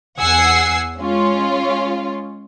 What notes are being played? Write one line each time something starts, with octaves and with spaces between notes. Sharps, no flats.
E2 F#5 G#5 E6 G#6 C7
G#3 C#4 F4